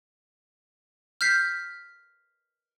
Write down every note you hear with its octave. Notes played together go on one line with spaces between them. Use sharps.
F6 G6 B6 C7